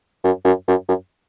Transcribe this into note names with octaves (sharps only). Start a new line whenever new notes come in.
F#2
F#2
F#2
F#2